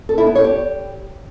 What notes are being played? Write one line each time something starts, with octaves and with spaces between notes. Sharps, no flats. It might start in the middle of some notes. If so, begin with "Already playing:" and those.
A4
E4
B3
C#5
G4